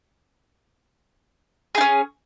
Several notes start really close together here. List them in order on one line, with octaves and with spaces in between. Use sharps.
G#4 D#4 C#4